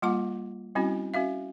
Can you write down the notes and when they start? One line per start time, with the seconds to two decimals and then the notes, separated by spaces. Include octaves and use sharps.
0.02 G3 A#3 F4 F#5 A5 D6
0.75 G3 C4 C#4 E4 F#4
1.14 C#4 F#4 E5 F5